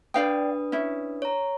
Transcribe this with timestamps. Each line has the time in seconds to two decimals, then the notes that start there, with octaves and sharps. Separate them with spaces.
0.14 D4 B4 D5 F5 G5 D#6
0.72 C#4 E4
1.22 C#5 A#5